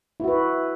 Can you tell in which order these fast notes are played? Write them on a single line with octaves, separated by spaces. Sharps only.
E4 F#4 B4